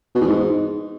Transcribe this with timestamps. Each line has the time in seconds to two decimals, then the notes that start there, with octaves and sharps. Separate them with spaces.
0.15 B2
0.21 E2
0.27 G#2